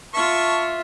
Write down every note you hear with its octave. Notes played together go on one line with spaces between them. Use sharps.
F4 E5 A5 C#6